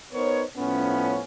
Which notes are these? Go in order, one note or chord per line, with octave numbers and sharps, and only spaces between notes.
B3 D#4 A#4 C5 C#5
A2 F3 B3 C#4